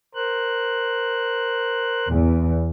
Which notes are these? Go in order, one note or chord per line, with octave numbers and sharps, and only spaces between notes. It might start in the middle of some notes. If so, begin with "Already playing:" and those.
A#4 C5 F#6
E2